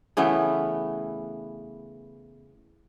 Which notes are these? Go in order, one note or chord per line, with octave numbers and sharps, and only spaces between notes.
C#3 E3 A3 B3